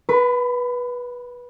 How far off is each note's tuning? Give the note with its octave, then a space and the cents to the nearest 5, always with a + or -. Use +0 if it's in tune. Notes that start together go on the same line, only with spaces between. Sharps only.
B4 -15 B5 +30